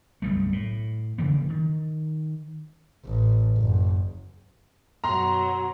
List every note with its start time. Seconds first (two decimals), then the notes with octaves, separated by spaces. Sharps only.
0.22 F#1 B1 G3 A3
0.52 A2
1.18 C#3 E3 F3 A#3
1.49 D#3
3.05 A1
3.56 F#1
5.04 F#2 B2 F#3 A#5 C6